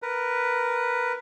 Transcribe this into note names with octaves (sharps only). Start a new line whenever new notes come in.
A#4 B4